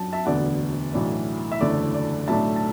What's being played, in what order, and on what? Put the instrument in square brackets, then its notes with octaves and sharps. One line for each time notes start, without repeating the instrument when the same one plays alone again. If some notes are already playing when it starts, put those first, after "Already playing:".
Already playing: [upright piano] F#2 F#3 D4 A5
E5 A5
E1 D2 D3 B3 D5 F#5
B1 A2 E3 D4
E5
F#1 E2 D3 A3 E4 D5
D5
B1 A2 A3 D4 E5 A5
A5